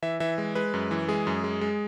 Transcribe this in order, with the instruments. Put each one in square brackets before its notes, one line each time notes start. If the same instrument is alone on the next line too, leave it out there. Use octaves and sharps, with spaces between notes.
[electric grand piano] E3 E5
E3 E5
G#3
G#3 B4
F#2
E3
G#3 G#4
F#2
G#3
G#3